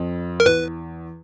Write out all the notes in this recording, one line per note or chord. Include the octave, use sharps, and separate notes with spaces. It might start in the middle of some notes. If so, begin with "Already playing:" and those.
Already playing: F2
A#4
E2 B4